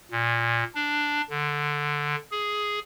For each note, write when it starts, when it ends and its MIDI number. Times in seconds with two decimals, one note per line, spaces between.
0.11 0.64 46
0.75 1.21 62
1.29 2.15 50
2.31 2.79 68